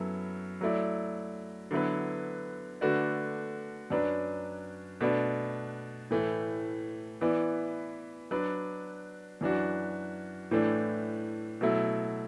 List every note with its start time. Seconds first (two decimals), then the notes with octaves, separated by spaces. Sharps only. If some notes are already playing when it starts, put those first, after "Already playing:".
Already playing: F#2 F#3 B3 E4 A4
0.61 F#3 A3 E4 D5
1.71 D3 F#3 B3 E4 B4
2.81 D3 A3 F#4 B4 D5
3.90 F#2 F#3 D4 B4 D5
5.01 B2 A3 D4 B4 D5
6.10 A2 E3 A3
7.21 E3 B3 E4 D5
8.31 F#3 D4 B4 D5
9.41 F#2 E3 D4 F#4
10.51 A2 E3 A3 D4
11.61 B2 F#3 A3 E4